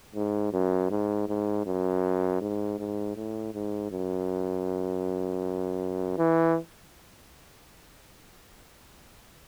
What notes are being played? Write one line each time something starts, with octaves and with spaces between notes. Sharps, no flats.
G#2
F#2
G#2
G#2
F#2
G#2
G#2
A2
G#2
F#2
E3